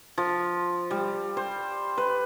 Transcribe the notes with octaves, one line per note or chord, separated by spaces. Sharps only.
F3
G3
C5
B4